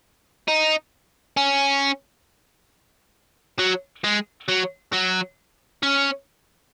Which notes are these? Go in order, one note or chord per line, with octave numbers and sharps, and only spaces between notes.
D#4
C#4
F#3
G#3
F#3
F#3
C#4